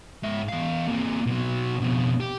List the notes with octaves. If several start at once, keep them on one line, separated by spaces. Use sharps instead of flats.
G#2 E5
E2 F5
C3 A#3
B2 F#3
F2 B2
G4